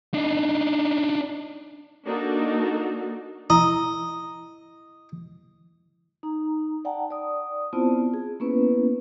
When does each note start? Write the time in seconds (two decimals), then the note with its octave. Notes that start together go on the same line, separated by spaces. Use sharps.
0.14 D4 D#4
2.05 A#3 D4 D#4 F#4 A4
3.50 E4 D#5 A#5 D#6
6.23 D#4 A#5
6.85 D5 F#5 G5 A5 A#5
7.10 D5 D#6
7.73 B3 C4 E4 F4 C5 A5
8.14 G#4
8.40 A#3 B3 C#4 E4 B4